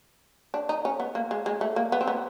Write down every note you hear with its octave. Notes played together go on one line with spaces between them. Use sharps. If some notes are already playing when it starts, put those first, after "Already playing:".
D4
D#4
C#4
B3
A#3
G#3
G#3
A3
A#3
B3
C4
B3